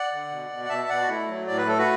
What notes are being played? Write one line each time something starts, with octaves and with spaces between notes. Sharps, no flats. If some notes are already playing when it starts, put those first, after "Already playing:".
Already playing: D5 F#5
D3
B2
B2
F#5
B2 E5 A5
B2 D5 F#5
F#4
A3 E4
F#3
A2 D5
B4
A3 A4
F#4 B4